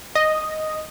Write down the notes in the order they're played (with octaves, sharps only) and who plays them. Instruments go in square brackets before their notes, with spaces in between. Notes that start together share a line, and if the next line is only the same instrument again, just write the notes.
[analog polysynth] D#5